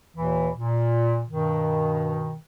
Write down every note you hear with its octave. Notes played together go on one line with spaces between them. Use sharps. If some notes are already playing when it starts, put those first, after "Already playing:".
D#2 A#2 E3
A#2
G2 B2 D#3